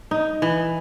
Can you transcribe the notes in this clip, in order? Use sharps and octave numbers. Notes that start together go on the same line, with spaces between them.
D#4
E3